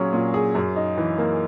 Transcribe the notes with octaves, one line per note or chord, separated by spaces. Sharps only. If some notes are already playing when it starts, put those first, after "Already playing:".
Already playing: A#2 F#3 C#4 G#4
A#2
G#4
F#2
D#4
E3
A#3